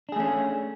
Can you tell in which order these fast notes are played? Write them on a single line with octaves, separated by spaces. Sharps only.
D4 G#4 A3 C#4